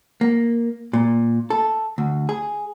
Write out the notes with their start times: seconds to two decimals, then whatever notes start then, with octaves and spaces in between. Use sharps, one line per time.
0.21 A#3
0.93 A#2
1.50 A4
1.98 D2
2.29 G#4